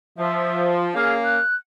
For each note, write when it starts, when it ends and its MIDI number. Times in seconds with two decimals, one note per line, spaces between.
0.18 0.88 53
0.18 0.69 76
0.95 1.37 58
0.95 1.37 61
0.95 1.15 68
0.95 1.37 77
1.25 1.55 90